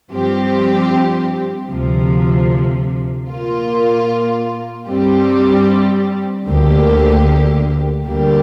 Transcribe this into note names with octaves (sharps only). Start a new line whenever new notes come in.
G2 F3 C4 G4
D2 C3 F3
A#2 A#3 F4
G2 G3 C4 G4
D2 D3 A#3 G4
D2 D3 G3 A#3 G4